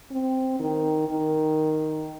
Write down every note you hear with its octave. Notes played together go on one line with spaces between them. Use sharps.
C4
D#3
D#3